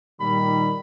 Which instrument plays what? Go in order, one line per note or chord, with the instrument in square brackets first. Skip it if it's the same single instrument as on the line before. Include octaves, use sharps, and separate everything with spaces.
[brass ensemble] A#2 D#3 G3 [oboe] B5